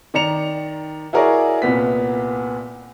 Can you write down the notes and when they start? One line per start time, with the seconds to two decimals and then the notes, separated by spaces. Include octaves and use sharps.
0.14 D#3 D5 A#5 C#7 F7
1.13 E4 F#4 G#4 A#4 C#5 D5
1.62 C2 A#2 B3 B6